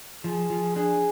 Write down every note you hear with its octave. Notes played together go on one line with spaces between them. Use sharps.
F3 G#4
F3
D4 G#4